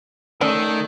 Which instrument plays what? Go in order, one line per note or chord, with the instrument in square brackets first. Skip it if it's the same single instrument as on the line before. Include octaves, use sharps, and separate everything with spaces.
[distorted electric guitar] D#3 [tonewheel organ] A3 [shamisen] C#4 D5 [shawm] A4